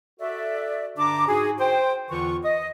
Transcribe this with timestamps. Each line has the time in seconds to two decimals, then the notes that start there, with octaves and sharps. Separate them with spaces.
0.20 F#4 A4 D5 E5
0.98 G2 D3 D4 A#5 D6
1.28 G#2 F#4 G#4
1.59 C5 G5
2.10 E2 D3 E3 F4 C#6
2.44 D#5